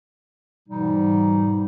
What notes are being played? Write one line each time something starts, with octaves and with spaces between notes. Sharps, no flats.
G#2 B2 E3 G3 D#4